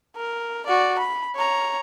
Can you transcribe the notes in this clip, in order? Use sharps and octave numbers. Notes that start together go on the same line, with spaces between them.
A#4
F#4 D5
B5
C#5 A#5